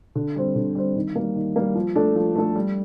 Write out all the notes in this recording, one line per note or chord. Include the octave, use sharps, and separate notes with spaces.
D3
G3 C4
D3
G3 C4
D#3
G3 A#3
D#3
G3 A#3
F3
A3 D4 A4
F3
A3 D4 A4
G3